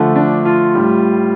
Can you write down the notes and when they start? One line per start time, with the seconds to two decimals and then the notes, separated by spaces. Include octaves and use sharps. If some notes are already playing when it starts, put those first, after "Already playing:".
Already playing: D3 F3 A3
0.16 D4
0.45 F4
0.74 A2 G3